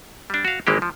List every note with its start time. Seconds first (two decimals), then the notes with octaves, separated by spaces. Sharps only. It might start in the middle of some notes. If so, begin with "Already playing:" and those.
0.30 G3 D4
0.45 F#4 F5
0.67 G#1 E3 G#3 A#3 G4
0.82 F3